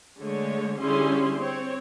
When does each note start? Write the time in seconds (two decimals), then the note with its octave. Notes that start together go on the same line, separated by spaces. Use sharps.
0.18 D3 G#3 A3 C#5
0.79 D3 G3 C#4 E4 G#4 C6
1.39 C4 C#5